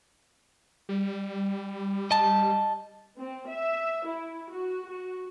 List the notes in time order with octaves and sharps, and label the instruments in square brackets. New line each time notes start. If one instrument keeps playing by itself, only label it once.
[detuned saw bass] G3
[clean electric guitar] D#5 A5
[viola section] C4
E5
E4
F#4
F#4